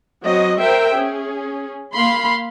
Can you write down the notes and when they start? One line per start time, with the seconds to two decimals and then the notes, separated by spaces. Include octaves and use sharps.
0.23 F#3 C4 F#4 D#5
0.60 A#4 C5 E5 G5
0.94 C#4 G#4
1.93 A#3 F5 B5 C6